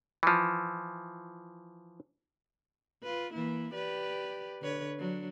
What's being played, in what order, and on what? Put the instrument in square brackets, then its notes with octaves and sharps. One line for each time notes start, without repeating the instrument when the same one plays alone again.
[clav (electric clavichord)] E3 F3
[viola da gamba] F4 B4
E3 A#3 E4
G4 B4 D5
D3 B4 C#5
F#3 D4